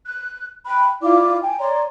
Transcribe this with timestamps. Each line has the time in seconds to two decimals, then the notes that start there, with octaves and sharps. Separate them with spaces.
0.05 F#6
0.65 G5 B5 F#6
1.02 E4 F4 D5 D6
1.42 G5 G#5
1.59 C#5 D5 A#5 C6